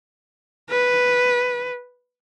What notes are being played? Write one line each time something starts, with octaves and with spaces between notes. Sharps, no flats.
B4